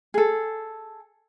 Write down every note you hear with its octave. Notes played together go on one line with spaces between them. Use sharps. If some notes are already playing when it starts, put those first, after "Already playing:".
G#4 A4